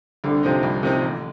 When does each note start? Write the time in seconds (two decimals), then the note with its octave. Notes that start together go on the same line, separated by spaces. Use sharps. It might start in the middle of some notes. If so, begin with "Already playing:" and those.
0.24 C2 D3
0.43 C3 F3 C4 D#4
0.63 C2
0.83 C3 F3 C4 D#4
1.02 A1